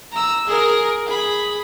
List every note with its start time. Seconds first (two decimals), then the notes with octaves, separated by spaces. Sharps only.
0.12 A#5 E6
0.48 G#4 A#4
1.06 G#4 B5